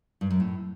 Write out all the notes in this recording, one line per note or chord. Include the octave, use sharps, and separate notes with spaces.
G2
F#2
A2